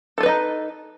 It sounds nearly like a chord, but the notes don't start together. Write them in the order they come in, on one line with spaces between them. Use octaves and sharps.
A4 F4 B4 D#5 D#4